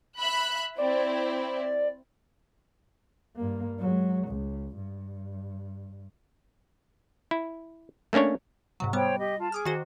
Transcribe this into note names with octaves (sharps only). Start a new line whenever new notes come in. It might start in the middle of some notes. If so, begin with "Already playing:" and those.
E5 B5 F#6
C4 E4 D5
G2 A#3
F#3 G#3
C#2
G2
E4
A3 A#3 C#4 D4 C#5
G#2 C3 F#3
G3 B3 C5 C#5 G5
G4 D#5
F4 A5
G#4 D6 D#6 F6
D#3 F#4 C5